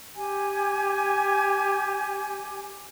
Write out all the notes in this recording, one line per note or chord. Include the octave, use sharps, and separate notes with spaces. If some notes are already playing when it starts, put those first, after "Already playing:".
G4 G#5